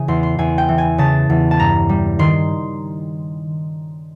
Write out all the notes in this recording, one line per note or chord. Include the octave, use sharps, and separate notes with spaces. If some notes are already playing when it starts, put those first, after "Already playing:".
Already playing: C#3 E3 G#5
E2 C6
C6
E2 G#5
G5
E3
G#5
C#3 A5
E2
A5
G2 A#5
G3
D#3 C6